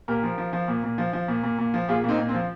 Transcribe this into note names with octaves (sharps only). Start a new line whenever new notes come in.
A#2 G4 A#4
F3
F3
F3
A#2
A#2
F3
F3
A#2
A#2
A#2
F3
A#2 F4 G#4
A#2 C4 D#4
A#2
C4
F3